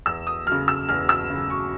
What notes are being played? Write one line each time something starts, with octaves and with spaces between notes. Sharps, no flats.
E2 E6
D#6
C#3 F#3 F6
E6
E2 F6
E6
C#3 F#3
C#6